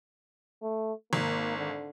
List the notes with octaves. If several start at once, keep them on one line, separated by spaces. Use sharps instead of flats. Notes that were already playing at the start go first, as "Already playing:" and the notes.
A3
G#1 A#3
D3